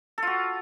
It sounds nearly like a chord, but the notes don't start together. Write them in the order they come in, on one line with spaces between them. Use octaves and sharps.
A4 F4 F#4